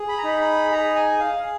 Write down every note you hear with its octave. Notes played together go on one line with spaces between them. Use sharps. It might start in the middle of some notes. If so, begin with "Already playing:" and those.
Already playing: G#4
B5
A#5
D#4 B5
B5
G#4 A#5
G#5
G#4 F5